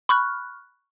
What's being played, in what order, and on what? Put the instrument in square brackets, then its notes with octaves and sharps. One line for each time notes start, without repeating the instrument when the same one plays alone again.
[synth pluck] B5 C#6 F6 F#6